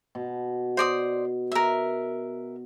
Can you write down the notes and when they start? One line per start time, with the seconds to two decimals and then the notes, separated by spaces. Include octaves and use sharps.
0.15 B2
0.77 C5 D5 D#6
1.52 A#4 E5